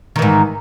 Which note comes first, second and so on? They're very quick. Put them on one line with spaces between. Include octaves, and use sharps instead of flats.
D#3 E3 G#2